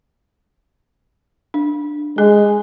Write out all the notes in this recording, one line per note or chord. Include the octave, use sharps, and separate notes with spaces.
D4
G#3 G#4